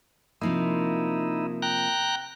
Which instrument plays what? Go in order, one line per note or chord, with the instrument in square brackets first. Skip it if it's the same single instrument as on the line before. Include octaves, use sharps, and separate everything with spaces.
[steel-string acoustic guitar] C3 F3 A#3 [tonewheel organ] D#4 E4
[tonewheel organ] G5 A#5 F#6